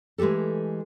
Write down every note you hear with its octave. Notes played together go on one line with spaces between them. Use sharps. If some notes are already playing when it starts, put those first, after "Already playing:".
E3 G#3 A3 G4 A4